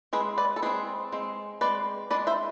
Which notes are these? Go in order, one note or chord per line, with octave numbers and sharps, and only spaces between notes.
G#3 C4 G#4 B4
B4 D5
A4
G#3 C4 G#4 B4
G#3 C4
G#3 C4 B4 D5
G#3 D4 B4 D5
C5 E5